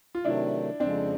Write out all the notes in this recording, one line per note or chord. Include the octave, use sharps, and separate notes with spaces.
F4
C3 D#3 F#3 A3 D4 E4
F2 C#3 F3 G#3 C4 D4